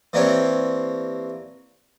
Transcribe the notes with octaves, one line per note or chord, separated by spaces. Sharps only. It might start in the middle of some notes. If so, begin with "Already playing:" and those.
E3 A#3 C4 D4 G4 C#5